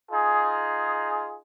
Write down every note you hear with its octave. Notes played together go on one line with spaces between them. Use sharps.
D#4 F4 G#4